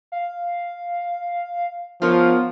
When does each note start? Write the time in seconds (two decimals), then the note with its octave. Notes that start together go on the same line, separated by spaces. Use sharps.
0.12 F5
2.02 F3 B3 F4 A#4 C#5